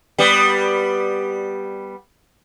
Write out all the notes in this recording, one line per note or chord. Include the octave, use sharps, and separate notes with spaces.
G3 B3